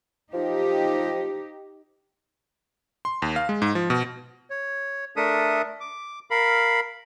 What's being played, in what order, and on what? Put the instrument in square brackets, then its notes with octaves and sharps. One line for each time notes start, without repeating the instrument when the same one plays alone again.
[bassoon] F3 [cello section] D#4 G4
[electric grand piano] C6
D#2
F5
G#3
G#2
F3
B2
[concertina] C#5
A3 D4 A4 A#4 E5 D#6
D6
A#4 F5 B5